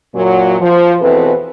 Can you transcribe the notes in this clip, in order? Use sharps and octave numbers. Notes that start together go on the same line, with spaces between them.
F#2 A#2 F#3
F3
E2 B2 E3 C4 A4 B4